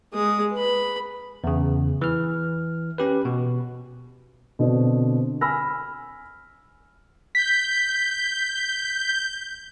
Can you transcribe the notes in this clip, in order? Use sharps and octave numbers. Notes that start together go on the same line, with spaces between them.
G#3 D#6
B4 B5
E2 C#3
E3 F6
C#4 G4 B4
B2
B2 D3 C4 D4
G#5 B5 E6 F6 A#6
G6 B6